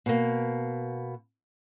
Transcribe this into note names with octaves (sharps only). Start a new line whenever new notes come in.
B2 A#3